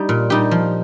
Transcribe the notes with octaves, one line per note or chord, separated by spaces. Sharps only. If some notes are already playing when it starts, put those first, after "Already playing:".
Already playing: G3 D#4 G4
A#2
G3 D#4 G4
F3